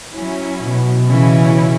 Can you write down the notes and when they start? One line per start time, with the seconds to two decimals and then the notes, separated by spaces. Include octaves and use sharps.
0.13 F#3 C#4 E4
0.60 B2
1.08 C#3 E3 C#4 E4